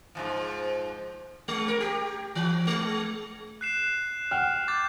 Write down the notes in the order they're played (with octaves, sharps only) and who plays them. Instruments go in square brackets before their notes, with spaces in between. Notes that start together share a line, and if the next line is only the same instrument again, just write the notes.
[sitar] G#2 B2 F3
G#3
A#4
G4
E3
G#3
[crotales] F#6 C7 E7
[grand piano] F#5 G5 F6
[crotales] D6 G6 A6